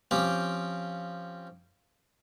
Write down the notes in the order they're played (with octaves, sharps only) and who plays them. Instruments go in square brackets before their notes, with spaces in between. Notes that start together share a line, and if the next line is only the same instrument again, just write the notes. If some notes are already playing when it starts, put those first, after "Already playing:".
[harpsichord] F3 C4 C#4 G4 G5